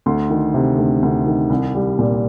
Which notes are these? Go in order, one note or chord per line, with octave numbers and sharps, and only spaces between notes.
D2 C6
D#3
C3
D2
D2
D#3
C2
G3
A#2